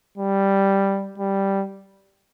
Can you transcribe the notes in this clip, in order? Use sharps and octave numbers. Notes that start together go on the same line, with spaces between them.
G3
G3